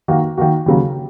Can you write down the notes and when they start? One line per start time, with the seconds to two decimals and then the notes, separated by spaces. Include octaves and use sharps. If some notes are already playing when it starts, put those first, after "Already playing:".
0.08 D#3 A#3 F#4
0.38 D#3 A#3 F#4
0.66 D#2 C#3 F#3 A#3